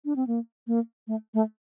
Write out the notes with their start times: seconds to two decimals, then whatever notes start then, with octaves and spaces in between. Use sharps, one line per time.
0.05 D4
0.16 C4
0.27 A#3
0.67 A#3
1.08 A3
1.34 A3